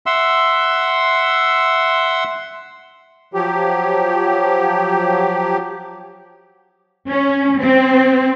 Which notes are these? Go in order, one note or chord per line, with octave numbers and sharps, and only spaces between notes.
E5 F#5 C6 E6
F3 F#3 G4
C#4
C4